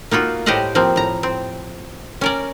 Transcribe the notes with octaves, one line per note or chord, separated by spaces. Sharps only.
A#3 D#4 F4 F#4
A2 G4 C5 D#5 F5 F#5
F3 A#3 C4
A2 A#5
C4
C#4 A#4 D5